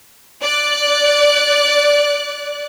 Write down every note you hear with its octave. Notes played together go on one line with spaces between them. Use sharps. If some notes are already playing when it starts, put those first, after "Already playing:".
D5 F#6